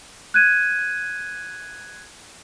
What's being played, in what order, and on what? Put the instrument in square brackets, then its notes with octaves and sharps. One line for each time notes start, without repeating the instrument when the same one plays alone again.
[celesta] F#6 G#6 D#7